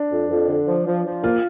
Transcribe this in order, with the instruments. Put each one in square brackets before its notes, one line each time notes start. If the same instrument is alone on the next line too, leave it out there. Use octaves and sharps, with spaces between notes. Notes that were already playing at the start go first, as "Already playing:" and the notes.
Already playing: [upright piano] D4
[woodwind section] F2
F2
D3
F3
F3
F3
[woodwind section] A#3 [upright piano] F4